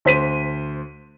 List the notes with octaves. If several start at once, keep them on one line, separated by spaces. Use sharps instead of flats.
D2 C5 B6 D#7